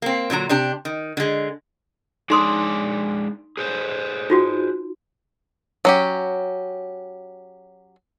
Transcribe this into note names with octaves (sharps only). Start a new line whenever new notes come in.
A#3 C4
A#2 D3 F#3 A#5
C3 D4 G4
D#3
D3 G#3
G#3 D4 D#4 D5 C6 D#6
G#4 B4 C5
D#4 F4 F#4
F#3 C#4 G4